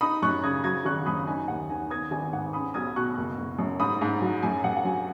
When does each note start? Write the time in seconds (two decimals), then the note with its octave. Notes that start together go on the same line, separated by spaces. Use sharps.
0.01 D#4 B5 D#6
0.22 F#2 C#6 F#6
0.43 C#3 D#6 G#6
0.64 F#3 D#6 G#6
0.85 G#1 C#6 F#6
1.06 F#2 B5 D#6
1.27 D#4 G#5
1.48 D#2 F#5
1.70 D#3 G#5
1.90 B3 D#6 G#6
2.11 G#1 G#5
2.32 G#2 F#5
2.53 C#4 B5 D#6
2.74 B1 D#6 G#6
2.96 B2 C#6 F#6
3.17 F#1
3.38 F#1
3.59 F#2
3.80 G#2 B5 D#6
4.01 G#2
4.22 F#3
4.43 F#2 G#5
4.64 F#2 F#5
4.76 F#5
4.85 F#3 G#5